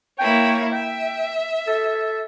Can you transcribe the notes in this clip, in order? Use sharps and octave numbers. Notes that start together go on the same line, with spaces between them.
A#3 E4 C#5 G5
E5 G5
A4